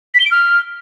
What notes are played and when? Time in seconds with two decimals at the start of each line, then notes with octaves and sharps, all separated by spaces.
0.14 B6
0.20 G7
0.25 D7
0.31 F6